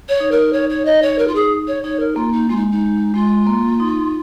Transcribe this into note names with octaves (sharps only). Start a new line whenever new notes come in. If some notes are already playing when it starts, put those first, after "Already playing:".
C#5
D#4
A#4
C#5
C#5
D#5
C#5
A#4
F4
G#4
C#5
D#4 C#5
A#4
A#3 F4
D#4
G#3 F4
D#4
D#4
G#3 F4
A#3
D#4